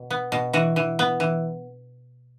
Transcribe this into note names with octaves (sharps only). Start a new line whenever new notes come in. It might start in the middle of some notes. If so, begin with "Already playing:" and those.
Already playing: B2
B3
B2
E3 F#4
E3
B3
E3